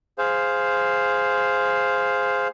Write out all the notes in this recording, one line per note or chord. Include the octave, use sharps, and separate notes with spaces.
G#4 C5 F5